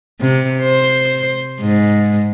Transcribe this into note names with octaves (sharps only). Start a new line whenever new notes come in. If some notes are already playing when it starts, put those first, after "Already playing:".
C3
C5
G#2